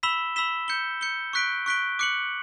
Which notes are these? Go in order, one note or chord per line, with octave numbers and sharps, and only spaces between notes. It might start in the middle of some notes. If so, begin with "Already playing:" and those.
B5 E6 B6 E7 G7
B5 E6 B6 E7 G7
G6 C#7 G7
G6 C#7 G7
C#6 F#6 B6 D7 G7
C#6 F#6 B6 D7 G7
D6 F#6 C#7 F#7